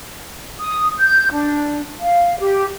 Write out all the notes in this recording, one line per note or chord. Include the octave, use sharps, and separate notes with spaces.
D#6
G6
D4
F5
G4